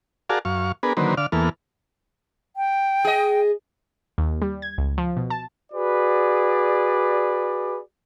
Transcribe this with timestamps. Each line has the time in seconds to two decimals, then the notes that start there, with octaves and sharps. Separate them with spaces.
0.29 F#4 G#4 A#4 D5 F5 A5
0.45 F#2 F5 C#6
0.83 B3 D4 G#4 A#4 B4
0.97 D3 D#3 F#3 A#3 B4 C5
1.17 D3 D5 F5 F6
1.32 E2 E3 A#3 B3 A4 F6
2.56 G5
3.05 G#4 D#5
4.18 D#2
4.42 G3
4.62 G#6
4.78 C#2
4.98 F3
5.17 B2
5.30 A5
5.72 F#4 G#4 B4 D5